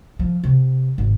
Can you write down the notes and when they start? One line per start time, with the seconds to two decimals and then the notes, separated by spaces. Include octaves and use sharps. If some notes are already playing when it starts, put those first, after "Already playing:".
0.19 F3
0.44 C3
0.98 G#1